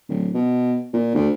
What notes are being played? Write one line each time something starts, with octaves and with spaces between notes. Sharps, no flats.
D1
B2
A#2
D2